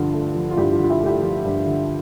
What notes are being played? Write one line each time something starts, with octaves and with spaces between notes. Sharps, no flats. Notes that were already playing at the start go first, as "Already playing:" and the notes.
Already playing: G2 D3 F3 F4
A3
F3
F4
G2 E4 G4
F4
D3
F4
E4 G4
A3
E4 G4
F3 F4
G2
D3